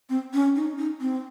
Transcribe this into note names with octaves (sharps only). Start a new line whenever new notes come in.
C4
C#4
D#4
D#4
C4